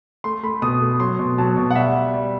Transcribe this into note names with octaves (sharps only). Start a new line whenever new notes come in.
A3 C6
A3 B5
B2 D#6
A3
F#3 C6
B2
F#3 A5
B2
F#5
G3 E5
G3
G3